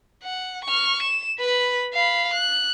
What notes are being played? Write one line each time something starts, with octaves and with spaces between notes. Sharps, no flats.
F#5
C#6 F6
E7
B4 B5
F5 B5
F#6